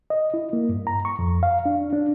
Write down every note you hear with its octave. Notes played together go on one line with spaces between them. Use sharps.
D#5
E4
A#3
G2
A#5
C#6
F2
F5
D4
D4